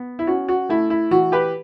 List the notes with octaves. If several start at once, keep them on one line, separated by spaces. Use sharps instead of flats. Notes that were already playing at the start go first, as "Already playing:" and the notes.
Already playing: B3
E4
C#4 F#4
F#4
A3 E4
E4
E3 F#4
G4 B4